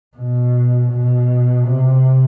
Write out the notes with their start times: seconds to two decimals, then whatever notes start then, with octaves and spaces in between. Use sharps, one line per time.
0.17 B2
0.92 B2
1.67 C3